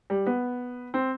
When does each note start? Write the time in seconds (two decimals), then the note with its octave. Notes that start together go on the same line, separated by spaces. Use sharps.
0.10 G3
0.26 B3
0.94 C4